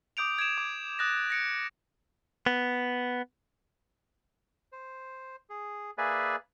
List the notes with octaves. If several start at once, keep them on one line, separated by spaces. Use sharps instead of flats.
D6 D#6 G6 D7 F7
G#6 D7 E7 F7
D6
D#6 F#6 A6 A#6
A#6 C#7 D7
B3
C5
G#4
A#3 G#4 B4 D5 E5 G#5